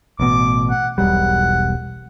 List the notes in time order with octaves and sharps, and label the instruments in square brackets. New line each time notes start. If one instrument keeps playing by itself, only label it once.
[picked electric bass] A1 B2 [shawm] D6
[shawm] F#5
[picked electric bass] E1 B1 G3 [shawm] F#5